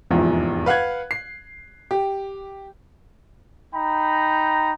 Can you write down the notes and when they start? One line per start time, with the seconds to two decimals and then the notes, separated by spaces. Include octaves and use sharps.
0.11 F1 A#1 E2 G#2
0.66 B4 F5 F#5 F#6 G#6
1.11 C7
1.91 G4
3.74 D#4 G5 A#5 B5